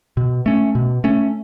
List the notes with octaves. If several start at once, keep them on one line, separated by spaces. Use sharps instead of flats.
B2
A3 C#4
B2
A3 C#4